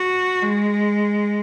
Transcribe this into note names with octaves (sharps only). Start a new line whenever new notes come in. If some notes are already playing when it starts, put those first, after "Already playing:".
Already playing: F#4
G#3